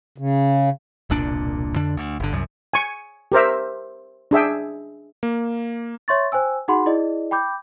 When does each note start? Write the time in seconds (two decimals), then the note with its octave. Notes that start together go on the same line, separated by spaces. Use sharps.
0.18 C#3
1.10 E1 C2 A#2 D4
1.75 F2 D3 D4
1.97 D2
2.20 G1 D3
2.33 C2 F#2
2.73 G#5 C#6
3.32 G4 A#4 C5 E5
4.31 D4 G#4 E5 G5
5.23 A#3
6.08 C#5 E5 C6 C#6 A6
6.32 C5 G5 G#5 E6
6.68 D#4 F#4 G#4 F#5 B5 C6
6.86 E4 G#4 D5 D#5
7.31 G5 B5 D6 G6